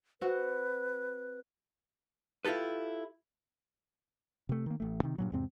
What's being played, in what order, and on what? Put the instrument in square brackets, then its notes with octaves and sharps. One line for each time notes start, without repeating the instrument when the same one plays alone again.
[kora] C4 F#4 [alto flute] B4
[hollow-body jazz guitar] E4 F4 G4 A4 B4
[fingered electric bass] C3 A3
D#3 A#3
A1 A3
C3 D#3
G2 A#2 F#3
E2 G#2 C3 C4